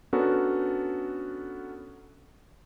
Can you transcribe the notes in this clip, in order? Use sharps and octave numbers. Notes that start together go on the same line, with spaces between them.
B3 C#4 D4 F#4 A4 A#4